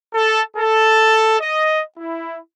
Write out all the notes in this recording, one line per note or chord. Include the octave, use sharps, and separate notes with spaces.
A4
A4
D#5
E4